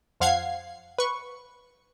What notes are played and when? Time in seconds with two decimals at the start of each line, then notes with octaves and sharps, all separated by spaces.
0.20 F2 F3 F5 F#5 G#6 C7
0.98 B4 C#6